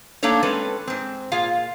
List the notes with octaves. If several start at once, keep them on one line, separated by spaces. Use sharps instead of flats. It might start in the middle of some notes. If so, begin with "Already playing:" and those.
A3 A#3 D4 D#4 A4 C#5
G#3 C4 C#4 A4 B4
G#2 C4
A#2 F4 G#4 F5